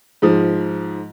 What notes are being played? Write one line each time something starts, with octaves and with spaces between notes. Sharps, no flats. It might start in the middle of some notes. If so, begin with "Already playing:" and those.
G#2 F3